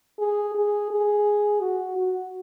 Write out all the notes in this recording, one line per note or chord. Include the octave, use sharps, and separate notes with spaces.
G#4
G#4
G#4
F#4
F#4